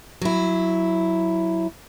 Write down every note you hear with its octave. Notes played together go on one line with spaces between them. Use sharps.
F#3 E4